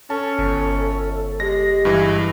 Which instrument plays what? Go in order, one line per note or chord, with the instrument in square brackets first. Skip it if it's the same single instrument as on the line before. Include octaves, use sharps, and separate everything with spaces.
[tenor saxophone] C#4 [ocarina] A4 [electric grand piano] A5
[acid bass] G1
[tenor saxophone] G#3 [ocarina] G4 [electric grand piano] A#6
[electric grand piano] G2 E3